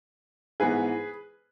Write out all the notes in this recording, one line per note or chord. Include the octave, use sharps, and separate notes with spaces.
G#2 E3 B3 G#4 B4